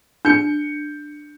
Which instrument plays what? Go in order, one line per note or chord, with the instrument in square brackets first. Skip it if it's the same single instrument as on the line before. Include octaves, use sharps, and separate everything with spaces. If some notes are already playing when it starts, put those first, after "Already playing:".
[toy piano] D4 [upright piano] G6 C#7